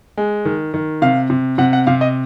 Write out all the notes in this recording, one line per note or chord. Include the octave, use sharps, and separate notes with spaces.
G#3
D#3
D#3
C3 F5
C3
C3 F#5
F#5
C3 F5
D#5